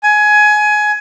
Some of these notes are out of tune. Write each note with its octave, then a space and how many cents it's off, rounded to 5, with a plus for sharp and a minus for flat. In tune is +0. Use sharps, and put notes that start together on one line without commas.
G#5 +20